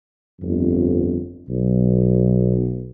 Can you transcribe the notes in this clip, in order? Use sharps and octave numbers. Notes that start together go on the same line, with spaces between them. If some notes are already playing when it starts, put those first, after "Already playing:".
G1 F2
B1